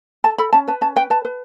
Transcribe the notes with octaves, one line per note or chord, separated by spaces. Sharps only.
A4 A5
A4 B5
C#4 A5
B4 A5
C#4 A5
B4 G5
B4 A5
B4